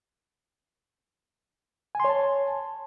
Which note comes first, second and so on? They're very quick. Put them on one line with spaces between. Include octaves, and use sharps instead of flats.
G#5 C6 C#5 A5